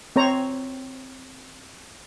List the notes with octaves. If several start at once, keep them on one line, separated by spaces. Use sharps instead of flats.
C4 C5 C#5 A#5